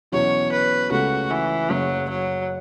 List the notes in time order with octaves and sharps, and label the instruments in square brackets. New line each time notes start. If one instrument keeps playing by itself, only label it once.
[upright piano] E2 B2 F#3 C#4 E4 [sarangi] C#5
[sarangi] B4
[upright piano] C#2 C#3 A3 C#4 A4 [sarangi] F#4
[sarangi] E3
[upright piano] F#1 F#2 C#3 [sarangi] F#3
[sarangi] F#3